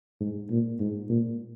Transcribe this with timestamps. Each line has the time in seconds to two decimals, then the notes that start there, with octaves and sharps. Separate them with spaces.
0.20 G#2
0.50 A#2
0.80 G#2
1.09 A#2